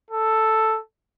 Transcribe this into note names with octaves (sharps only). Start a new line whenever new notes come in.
A4